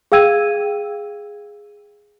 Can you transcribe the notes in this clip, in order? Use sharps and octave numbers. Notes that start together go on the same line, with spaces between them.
G#4 F5 G5 E6 G#6 D#7